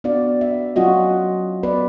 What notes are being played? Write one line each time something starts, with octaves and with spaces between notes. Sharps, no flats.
B3 D4 F#4 D5 F5
E5
F#3 C#4 F4 F#4 D#5
B3 B4 D5